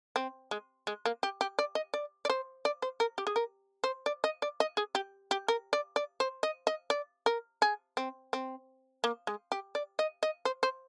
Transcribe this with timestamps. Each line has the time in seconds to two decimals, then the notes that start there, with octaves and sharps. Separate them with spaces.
0.16 C4
0.51 G#3
0.87 G#3
1.05 A#3
1.23 G4
1.41 G4
1.59 D5
1.75 D#5
1.94 D5
2.25 D5
2.30 C5
2.65 D5
2.82 C5
3.00 A#4
3.18 G4
3.27 G#4
3.36 A#4
3.84 C5
4.06 D5
4.24 D#5
4.42 D5
4.60 D#5
4.77 G#4
4.95 G4
5.31 G4
5.48 A#4
5.73 D5
5.96 D5
6.20 C5
6.43 D#5
6.67 D#5
6.90 D5
7.26 A#4
7.62 G#4
7.97 C4
8.33 C4
9.04 A#3
9.27 G#3
9.52 G4
9.75 D5
9.99 D#5
10.23 D#5
10.45 C5
10.63 C5